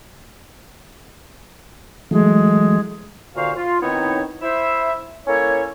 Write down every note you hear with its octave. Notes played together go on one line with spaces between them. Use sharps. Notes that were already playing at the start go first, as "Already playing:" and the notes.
E3 F#3 G#3 A3
D#2 A#2 D3 F#4 C5 F5
F4
D#3 B3 C4 D#4 E4 C#5
E4 C5 E5
A#3 C#4 E4 A4 C#5